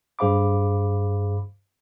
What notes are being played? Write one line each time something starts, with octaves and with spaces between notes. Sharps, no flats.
G2 G#4 C5 F5 B5 D6